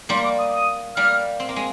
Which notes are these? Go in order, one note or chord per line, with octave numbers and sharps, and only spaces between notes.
G3 A#3 C6
D6
D#6
D#6
G3 A#3 F6
C4
A#3
G#3